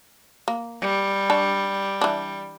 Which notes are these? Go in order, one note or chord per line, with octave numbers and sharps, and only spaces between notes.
A#3
G3
D4 C#5 A5
E3 D4